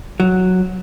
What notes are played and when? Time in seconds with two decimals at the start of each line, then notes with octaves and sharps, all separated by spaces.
0.20 F#3